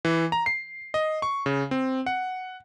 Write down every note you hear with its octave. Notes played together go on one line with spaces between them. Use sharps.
E3
A#5
C7
D#5
C#6
C#3
C4
F#5